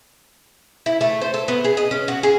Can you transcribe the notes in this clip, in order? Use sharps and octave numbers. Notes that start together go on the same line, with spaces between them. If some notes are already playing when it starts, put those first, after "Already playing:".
E4
A3
C5
A4
B3
G#4
D#5
C#4
F#4
G#4